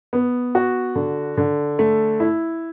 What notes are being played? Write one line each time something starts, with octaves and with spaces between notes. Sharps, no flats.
B3
F#4
D3
D3
A3
E4